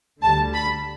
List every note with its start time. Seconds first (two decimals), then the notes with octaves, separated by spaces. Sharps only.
0.22 D2 D3 G3 A5
0.54 B5